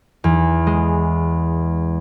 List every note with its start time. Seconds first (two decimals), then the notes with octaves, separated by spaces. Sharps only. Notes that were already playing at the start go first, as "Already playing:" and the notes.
0.24 E2
0.67 G#3